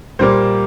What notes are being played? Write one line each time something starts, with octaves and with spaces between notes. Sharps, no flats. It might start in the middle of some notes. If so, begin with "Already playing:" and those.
A#2 G3 A#3 C5